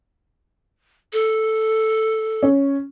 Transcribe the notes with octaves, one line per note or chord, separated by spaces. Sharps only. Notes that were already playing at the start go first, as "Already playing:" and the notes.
A4
C#4